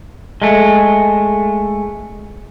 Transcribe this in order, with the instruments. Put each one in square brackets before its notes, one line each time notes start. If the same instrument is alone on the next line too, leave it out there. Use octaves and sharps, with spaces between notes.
[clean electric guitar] G#3 A3